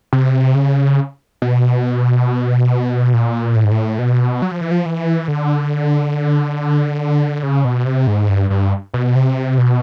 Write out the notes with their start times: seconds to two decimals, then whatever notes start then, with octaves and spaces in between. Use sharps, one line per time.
0.13 C3
0.55 C#3
1.42 B2
3.14 A#2
3.56 A2
3.64 G#2
3.71 A2
3.99 B2
4.42 F#3
4.51 F3
4.61 E3
4.71 F3
4.86 E3
5.28 D3
7.43 C#3
7.65 B2
7.86 C3
8.07 G#2
8.29 G2
8.50 G2
8.94 B2
9.15 C3
9.58 B2